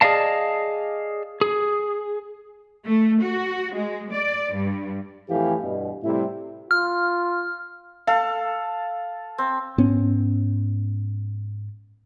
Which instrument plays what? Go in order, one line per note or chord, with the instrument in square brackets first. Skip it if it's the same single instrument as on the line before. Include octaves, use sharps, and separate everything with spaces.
[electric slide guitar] G#4 D5 D#5 F5 A5
G#4
[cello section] A3
F#4
G#3
D5
G2
[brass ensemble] F2 A2 E3 G4 F5 G#5
G2 B2
A2 C3 G3 E4
[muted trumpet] F4 [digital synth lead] F6
[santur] A4 [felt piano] F5
[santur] C4
[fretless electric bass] G#2 B3 C#4